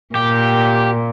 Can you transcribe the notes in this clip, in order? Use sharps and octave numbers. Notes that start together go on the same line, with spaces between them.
A#2 G4